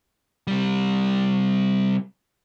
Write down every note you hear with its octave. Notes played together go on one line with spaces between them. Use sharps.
C3 G3